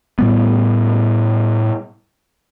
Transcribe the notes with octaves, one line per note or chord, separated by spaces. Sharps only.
A2 G3 B3